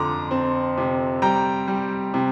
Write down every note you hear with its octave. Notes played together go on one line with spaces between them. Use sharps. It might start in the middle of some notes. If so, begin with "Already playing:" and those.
Already playing: F2 D3 A#5 C6 D6
C4
C3
G3 G5 A#5
G3
C3